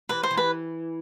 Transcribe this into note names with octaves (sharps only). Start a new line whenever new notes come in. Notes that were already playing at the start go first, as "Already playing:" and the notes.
E3 B4
C5
E3
B4